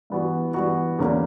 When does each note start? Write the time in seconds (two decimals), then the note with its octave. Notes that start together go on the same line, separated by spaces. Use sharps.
0.10 G2 E3 B3 F#4
0.54 G2 E3 B3 F#4
0.99 E2 D3 A#3 C#4 E4